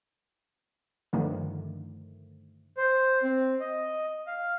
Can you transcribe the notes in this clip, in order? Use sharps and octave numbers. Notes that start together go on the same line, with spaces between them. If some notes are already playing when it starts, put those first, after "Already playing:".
G2 D3 D#3 F3 A3
C5
C4
D#5
F5